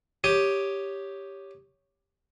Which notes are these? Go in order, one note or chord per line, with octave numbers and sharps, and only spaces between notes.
G4 C#5 D#6